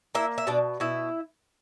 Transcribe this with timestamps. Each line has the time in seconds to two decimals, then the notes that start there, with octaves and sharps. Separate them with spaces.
0.15 A#3 E4 E5
0.38 E5
0.47 B2 D4 D5
0.80 B2 E4 E5